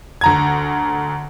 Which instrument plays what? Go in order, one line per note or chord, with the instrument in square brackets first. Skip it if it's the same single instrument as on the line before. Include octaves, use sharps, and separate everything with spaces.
[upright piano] D2 A#5 G#6